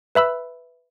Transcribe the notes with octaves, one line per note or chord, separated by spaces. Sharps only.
B4 E5 B5 E6